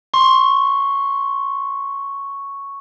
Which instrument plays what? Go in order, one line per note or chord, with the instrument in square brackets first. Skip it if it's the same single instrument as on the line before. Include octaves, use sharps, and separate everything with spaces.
[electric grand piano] C6 [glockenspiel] C#6